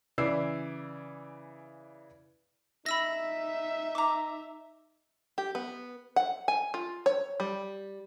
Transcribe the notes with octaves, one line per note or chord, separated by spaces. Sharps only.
C#3 E3 E4 D5 E6 C7
D#4 E5 B5 E6 A#6
A#5 D6
G4
B3
F#5
G#5
F4
C#5
G3